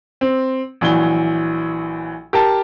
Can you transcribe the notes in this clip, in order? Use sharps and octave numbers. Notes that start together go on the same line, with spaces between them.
C4
A#1 E3 F#3 G7
G4 A#4 A5